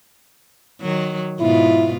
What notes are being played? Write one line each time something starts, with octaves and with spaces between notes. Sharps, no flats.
D#3 F#3
G#2 B2 E4 F4